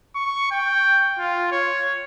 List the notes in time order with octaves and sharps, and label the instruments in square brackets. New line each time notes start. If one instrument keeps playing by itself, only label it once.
[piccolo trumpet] C#6
G5
F4
C#5